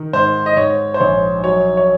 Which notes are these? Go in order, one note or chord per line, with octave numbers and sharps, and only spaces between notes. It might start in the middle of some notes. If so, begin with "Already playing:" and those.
Already playing: D#3
G#2 C5
D#5
G#2 C#5
C5
A#1 C#5
F#3 C#5
C#5